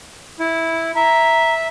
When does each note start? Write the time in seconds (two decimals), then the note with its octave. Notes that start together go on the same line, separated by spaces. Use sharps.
0.40 E4
0.95 E5 A#5